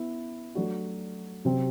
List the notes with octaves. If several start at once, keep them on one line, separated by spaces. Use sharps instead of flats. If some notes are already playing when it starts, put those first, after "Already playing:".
Already playing: B3 E4 B4
F#3 A3 D4 F#4
C3 F#3 C4